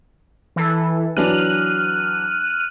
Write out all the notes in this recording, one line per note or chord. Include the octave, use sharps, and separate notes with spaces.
E3 A4
E3 F#3 D4 F6 F#6 D#7